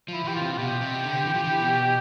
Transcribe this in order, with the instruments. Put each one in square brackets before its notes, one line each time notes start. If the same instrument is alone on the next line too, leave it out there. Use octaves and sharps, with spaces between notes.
[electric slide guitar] F3 [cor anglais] E4
[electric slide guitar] E3 [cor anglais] G4
[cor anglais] F4
[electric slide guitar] C3
[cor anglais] F4
[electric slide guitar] B2 [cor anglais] G4
[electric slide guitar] C3
D3
E3
F3
E3
B2